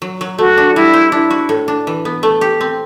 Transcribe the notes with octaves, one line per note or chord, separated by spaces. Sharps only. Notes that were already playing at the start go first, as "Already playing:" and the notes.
F#3
F#3
A3 F#4
D4
G3 E4
C5
D4 E4
F#4
A2
D4
E3
B3
A3
G4
C4